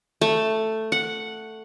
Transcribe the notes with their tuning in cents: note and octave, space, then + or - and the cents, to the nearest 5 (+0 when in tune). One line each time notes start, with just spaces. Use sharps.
A3 +5
F#5 -5